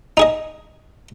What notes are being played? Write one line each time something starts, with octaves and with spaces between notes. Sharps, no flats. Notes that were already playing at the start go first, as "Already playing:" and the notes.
D#4 G#4 D#5